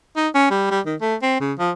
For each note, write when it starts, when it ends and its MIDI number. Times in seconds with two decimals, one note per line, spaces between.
0.16 0.28 63
0.35 0.48 61
0.51 0.68 55
0.71 0.80 55
0.86 0.95 51
1.01 1.15 57
1.22 1.37 60
1.40 1.53 49
1.59 1.71 53